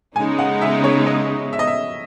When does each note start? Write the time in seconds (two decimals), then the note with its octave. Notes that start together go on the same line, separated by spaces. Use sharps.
0.16 C#3 G#3 B3 D#4 G#5
0.39 F#5
0.62 E5
0.84 C#5
1.06 D#5
1.53 E5
1.59 D#5
1.67 E5